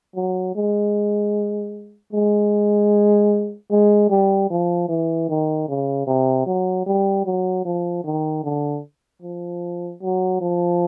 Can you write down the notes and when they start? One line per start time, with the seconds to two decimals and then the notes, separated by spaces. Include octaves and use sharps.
0.16 F#3
0.56 G#3
2.13 G#3
3.71 G#3
4.10 G3
4.50 F3
4.89 E3
5.29 D#3
5.69 C#3
6.07 C3
6.46 F#3
6.86 G3
7.25 F#3
7.65 F3
8.04 D#3
8.44 D3
9.22 F3
10.02 F#3
10.41 F3